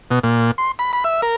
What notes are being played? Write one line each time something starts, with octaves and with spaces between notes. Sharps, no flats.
B2
A#2
C6
B5
B5
E5
A#4